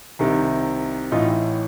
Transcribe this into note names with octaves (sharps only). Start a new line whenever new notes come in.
C2 C3 D#3
A1 A2 E3 D#4 F4